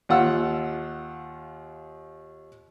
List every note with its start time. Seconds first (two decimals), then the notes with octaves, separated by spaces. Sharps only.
0.09 D#2 F4 F#5 E6